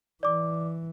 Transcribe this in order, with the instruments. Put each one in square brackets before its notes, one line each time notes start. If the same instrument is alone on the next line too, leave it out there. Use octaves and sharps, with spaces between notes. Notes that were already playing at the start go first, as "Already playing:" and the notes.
[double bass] E3 [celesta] D5 D6